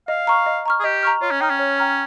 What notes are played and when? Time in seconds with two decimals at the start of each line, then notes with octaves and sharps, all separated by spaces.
0.08 D#5 F5
0.27 A#5 C#6 F6
0.46 D#5
0.66 A#5 C#6 F6
0.80 G#4
0.84 G4 D#5
1.03 A#5 C#6 F6
1.21 F4 C#5
1.31 C#4
1.40 D#4 G5 A#5 F6
1.50 C#4
1.59 C#5
1.78 G5 A#5 F6